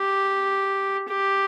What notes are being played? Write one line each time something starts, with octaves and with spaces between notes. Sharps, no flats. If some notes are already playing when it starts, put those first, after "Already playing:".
Already playing: G4
G4